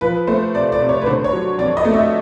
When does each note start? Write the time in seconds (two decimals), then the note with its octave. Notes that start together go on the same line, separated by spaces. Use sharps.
0.01 F3 B4
0.27 A3 C5
0.54 C3 D5
0.72 D5
0.81 C3
0.89 C#5
1.02 B4
1.06 D3 C5
1.24 C#5
1.33 F#3
1.59 F2 D5
1.77 D#5
1.85 A3
1.94 E5